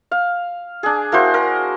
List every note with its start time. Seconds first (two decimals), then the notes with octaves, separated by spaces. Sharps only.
0.11 F5
0.83 D4 G#4
1.12 A#3 E4 F#4 C5
1.34 A#4